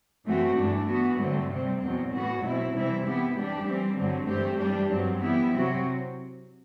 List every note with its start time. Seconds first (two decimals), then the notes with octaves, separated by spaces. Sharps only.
0.24 F#2 E3 A3 C4 F#4
0.55 G2 E3 A3 D4
0.87 E3 B3 F#4
1.17 G2 D3 F#3 A3 C4
1.49 C3 G3 C4
1.80 E2 B2 F#3 C4
2.11 A2 E3 B3 F#4
2.41 B2 F#3 C4 E4
2.73 C3 E3 G3 C4 E4
3.04 E3 B3 E4 G4
3.36 E3 G3 D4 G4
3.66 E3 G3 C4
3.97 G2 D3 F#3 C4
4.28 G2 E3 A3 C4 G4
4.59 E3 G3 D4 G4
4.91 G2 F#3 C4
5.21 E3 B3 E4 G4
5.52 C3 F#3 C4 F#4